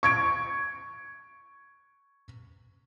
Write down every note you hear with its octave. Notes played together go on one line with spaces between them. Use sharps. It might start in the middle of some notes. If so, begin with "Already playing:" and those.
C#6 G#6 D7